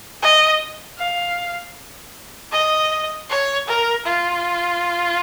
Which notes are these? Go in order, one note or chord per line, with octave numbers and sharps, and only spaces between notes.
D#5
F5
D#5
C#5
A#4
F4